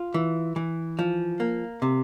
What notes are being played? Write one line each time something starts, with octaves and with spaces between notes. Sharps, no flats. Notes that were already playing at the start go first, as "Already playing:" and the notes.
Already playing: F4
E3
E3
F3
A#3
C3